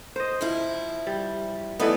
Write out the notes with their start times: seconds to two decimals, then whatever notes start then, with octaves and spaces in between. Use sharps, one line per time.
0.16 C5 D#5
0.41 G#2 F3 E4
1.07 G3
1.80 E3 A3 B3 D#4 B4 D5